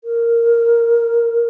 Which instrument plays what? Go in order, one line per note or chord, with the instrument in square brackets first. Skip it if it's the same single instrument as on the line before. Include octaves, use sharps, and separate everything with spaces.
[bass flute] A#4